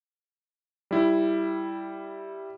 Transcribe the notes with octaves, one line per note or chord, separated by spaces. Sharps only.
G3 E4